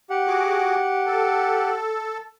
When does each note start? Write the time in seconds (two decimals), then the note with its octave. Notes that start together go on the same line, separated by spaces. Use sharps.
0.10 G4 F#5
0.27 F#4 G#4 D6
1.06 A4